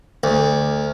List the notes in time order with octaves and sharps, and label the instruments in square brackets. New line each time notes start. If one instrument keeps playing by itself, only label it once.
[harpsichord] D2